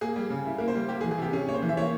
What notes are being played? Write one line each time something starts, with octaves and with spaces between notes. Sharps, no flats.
A#3 G#4
G3
C#3
E4
A#3 A#4
C5
G3
A#3 G4
G#4
E3
G#4
C3 G4
C#4 G#4
A#3 C#5
C5
E3
E5
A#3 C#5